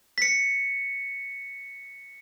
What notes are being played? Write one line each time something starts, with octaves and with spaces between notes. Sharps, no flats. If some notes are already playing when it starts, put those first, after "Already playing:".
B6 C#7